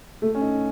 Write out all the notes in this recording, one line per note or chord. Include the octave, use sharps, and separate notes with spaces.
A3
C#4
D#4